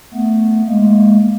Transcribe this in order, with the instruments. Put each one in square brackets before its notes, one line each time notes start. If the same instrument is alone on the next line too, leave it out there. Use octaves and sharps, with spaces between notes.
[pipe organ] A3 B3
G#3 A#3